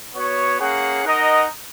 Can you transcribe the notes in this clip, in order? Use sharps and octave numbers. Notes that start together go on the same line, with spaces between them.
B3 F#4 C#5
A#3 C#4 G#4 C#5 F#5
D#4 A#4 D#5 F#5